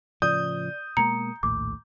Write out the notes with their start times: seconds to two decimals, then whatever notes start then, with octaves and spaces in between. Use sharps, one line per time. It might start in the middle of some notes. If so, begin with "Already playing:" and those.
0.22 A2 C#3 F3 D5 D#6 G6
0.97 B2 G#3 A#3 A#5 C#7
1.43 A#1 D#2 A2 D6